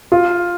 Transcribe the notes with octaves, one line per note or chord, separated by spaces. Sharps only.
F4